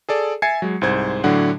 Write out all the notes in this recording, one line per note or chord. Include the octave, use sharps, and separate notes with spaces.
G#4 A4 D5
E5 G#5 G#6 A6 C7 C#7
F#3 G#3
C2 G#2 C5 G#6
A2 D3 F#3 D4 F#5